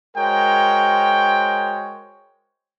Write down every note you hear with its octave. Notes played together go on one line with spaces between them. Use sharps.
G#3 F#4 A#4 C5 C#5 G5